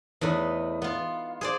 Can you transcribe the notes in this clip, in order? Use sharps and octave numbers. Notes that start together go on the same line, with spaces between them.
E2 A2 D#4 B4
B3 F4
G#4 C5 D5